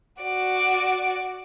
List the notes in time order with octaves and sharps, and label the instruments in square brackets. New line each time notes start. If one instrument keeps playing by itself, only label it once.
[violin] F#4 D5